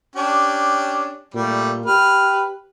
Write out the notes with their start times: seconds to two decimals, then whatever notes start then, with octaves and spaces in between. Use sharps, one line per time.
0.16 C#4 D4 G4
1.34 A#2 G3 A3
1.86 G4 B4 F6